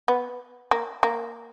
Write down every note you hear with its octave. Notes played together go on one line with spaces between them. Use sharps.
B3
A#3
A#3